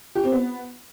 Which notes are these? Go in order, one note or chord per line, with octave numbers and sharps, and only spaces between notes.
G4
C4
B3